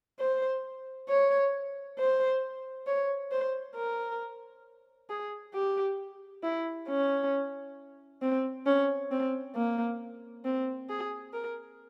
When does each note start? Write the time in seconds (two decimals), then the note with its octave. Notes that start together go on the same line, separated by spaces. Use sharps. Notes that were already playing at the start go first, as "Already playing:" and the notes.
0.20 C5
1.09 C#5
1.99 C5
2.87 C#5
3.32 C5
3.76 A#4
5.10 G#4
5.54 G4
6.44 E4
6.89 C#4
8.22 C4
8.66 C#4
9.11 C4
9.56 A#3
10.45 C4
10.89 G#4
11.34 A#4